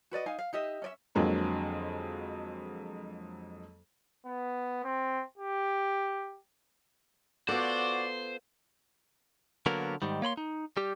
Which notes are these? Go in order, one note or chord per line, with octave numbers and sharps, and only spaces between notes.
F#4 B4 D5 D#5
D#4 F5 G#5
F5
D#4 G4 D#5 E5
C#4 D5 E5
F2 D3 F#3 G#3 A#3
B3
C4
G4
B3 F4 F#4 A4 C5 D5
D3 F#3 A#3 B3 A#4
G#2 D#3 G3
A#3 C#5 B5 C6
D#4
G3 G4